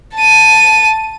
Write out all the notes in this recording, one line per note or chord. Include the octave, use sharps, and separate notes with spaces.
A5 D#7